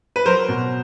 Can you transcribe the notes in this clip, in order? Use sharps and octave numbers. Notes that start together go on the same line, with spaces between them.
B4
F#3 A#4 C5
B2